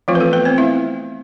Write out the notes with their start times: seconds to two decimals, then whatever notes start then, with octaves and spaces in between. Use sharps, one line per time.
0.08 E3 F3 A3 C4 F4
0.15 B4
0.20 A3 A4
0.33 B3 B4
0.45 C4 C5
0.58 A3 C4 E4 E5